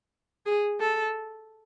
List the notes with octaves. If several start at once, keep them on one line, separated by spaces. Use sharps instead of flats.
G#4
A4